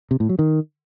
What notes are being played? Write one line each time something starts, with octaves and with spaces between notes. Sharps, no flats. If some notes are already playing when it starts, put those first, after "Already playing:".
C3
A2
F#3
D#3